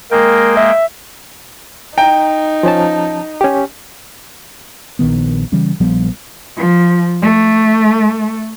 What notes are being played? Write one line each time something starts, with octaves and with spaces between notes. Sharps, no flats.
G#3 A#3 A#4 G5
E5
D#4 G5 A#5
F3 C#4 A5
C#4 G4
A#1 D#3 B3
C#3 E3 G3 C#4
A#1 F3 G3 B3
F3
A3